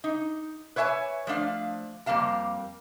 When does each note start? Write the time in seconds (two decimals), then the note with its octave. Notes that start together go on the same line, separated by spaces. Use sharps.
0.04 D#4
0.76 B4 C#5 E5 G5 G#5
1.27 F3 A3 D4 F5
2.06 F2 G3 A#3 F5 A5